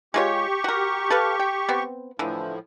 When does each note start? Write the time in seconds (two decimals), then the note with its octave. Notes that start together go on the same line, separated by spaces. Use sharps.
0.14 G#3 F4 G4 C#5 C#6
0.64 F#4 A#4
1.10 A4 B4 F5
1.40 G5
1.69 B3 C4
2.19 A2 D3 E3 F3